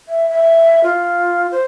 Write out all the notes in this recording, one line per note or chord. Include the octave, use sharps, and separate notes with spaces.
E5
E5
F4
C5